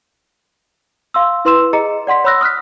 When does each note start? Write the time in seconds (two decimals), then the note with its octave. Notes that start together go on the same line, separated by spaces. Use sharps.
1.14 F5 C6 E6
1.45 E4 B4 C6 E6 E7
1.73 G#4 D#5 A#5 C#7
2.07 D5 F#5 C6 B6
2.24 C#5 B5 C6 E6 F#6 A#6
2.41 D#6 F6 F#6 B6